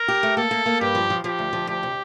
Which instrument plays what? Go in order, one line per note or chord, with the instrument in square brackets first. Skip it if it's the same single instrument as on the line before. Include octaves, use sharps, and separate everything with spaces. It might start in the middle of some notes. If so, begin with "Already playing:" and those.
Already playing: [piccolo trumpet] A#4
[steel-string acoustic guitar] G4
A3
[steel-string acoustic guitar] A#3 [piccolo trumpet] A4
[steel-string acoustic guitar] A#3
A#3
[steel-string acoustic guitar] G2 [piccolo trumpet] G4
[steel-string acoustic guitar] F3
F3
[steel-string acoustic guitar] F3 [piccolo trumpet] G4
[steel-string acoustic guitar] D2
F3
[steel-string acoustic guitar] D2 [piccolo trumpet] G4
[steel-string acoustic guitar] C3